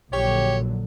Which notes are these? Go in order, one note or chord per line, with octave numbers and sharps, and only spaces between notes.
A#1 D3 F#3 G4 C#5